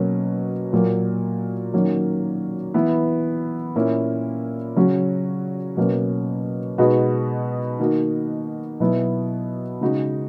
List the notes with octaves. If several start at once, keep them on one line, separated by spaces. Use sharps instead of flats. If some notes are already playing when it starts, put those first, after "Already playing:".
Already playing: B2 F#3 A#3 C#4
A#2 F#3 A#3
D#3 F#3 A#3 C#4
E3 B3 E4
A#2 A#3 C#4 E4
C#3 F#3 C#4 F#4
B2 F#3 A#3 C#4
B2 G#3 B3 D#4 F#4
D#3 A#3 D#4 F#4
B2 F#3 B3 E4
C#3 G#3 D#4 F#4